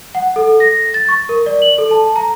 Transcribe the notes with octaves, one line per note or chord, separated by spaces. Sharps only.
F#5
A4
A#6
A6
C#6
A#4
D5
F#7
A4
A5
A#5